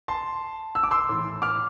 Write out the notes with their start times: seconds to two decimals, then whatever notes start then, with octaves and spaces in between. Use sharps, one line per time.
0.08 A5 C6
0.75 E6
0.83 D6
0.91 C6 E6
1.09 A2 E3
1.42 D6 F6